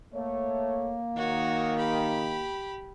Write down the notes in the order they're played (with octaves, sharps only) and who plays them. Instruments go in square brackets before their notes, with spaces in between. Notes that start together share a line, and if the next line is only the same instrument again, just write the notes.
[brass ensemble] A3 C#5 [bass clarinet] A#3
[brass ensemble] D#3 [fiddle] F#4 C#5
[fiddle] G4 B5